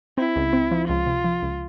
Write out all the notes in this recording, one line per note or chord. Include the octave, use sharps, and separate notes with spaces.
C4 E4
C#2
C4
F3
C#2 F4
C3
F3
C#2